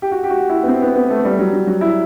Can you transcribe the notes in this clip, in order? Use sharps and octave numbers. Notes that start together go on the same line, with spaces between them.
G4
F#4
G4
F#4
E4
B3
C4
B3
B3
A3
G3
F#3
F#3
F#3
E4